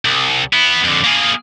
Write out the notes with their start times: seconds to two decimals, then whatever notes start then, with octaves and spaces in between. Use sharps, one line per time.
0.05 C2
0.53 B3 E4
0.84 F2 D3
1.04 A#3 G#4